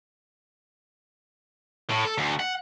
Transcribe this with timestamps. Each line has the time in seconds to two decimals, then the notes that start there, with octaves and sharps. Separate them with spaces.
1.90 A2
2.05 A4
2.18 D2
2.39 F#5